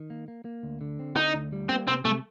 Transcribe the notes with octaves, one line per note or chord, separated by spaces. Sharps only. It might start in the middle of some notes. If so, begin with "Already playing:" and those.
Already playing: D#3
A#3
A#3
A#3
D2
D3
C4
D3 D#4
D2
G3
A#3 C4
C3 C4
C3 A3